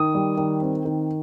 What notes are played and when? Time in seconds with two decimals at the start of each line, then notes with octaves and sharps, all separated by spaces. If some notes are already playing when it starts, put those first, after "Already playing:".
Already playing: D#3 D#6
0.14 G3
0.37 D#3
0.61 C4
0.85 D#3